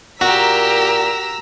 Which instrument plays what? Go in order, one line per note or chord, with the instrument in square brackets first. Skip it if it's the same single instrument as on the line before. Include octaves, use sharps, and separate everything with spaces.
[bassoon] A#2 [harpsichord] F#4 [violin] G4 A#4 [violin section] A#5 E6 B6